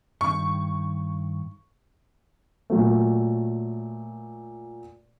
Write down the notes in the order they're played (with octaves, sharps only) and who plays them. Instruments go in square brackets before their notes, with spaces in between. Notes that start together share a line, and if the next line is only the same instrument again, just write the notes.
[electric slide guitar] G2 D#3 [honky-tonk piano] C#6
[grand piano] A#2 F#3 A3